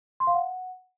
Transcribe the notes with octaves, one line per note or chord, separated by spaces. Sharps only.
C6
F5
F#5